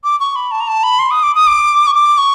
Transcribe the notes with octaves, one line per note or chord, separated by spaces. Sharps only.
D6
C#6
B5
A5
A#5
A5
B5
C6
D#6
D6
D#6
D6
C#6
D6
C#6